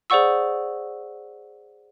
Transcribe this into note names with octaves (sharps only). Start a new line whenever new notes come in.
G#4 C5 D5 F#5 C#6 E6